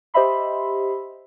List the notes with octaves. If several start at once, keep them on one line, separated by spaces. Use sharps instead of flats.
G4 C5 D#5 E5 B5 C6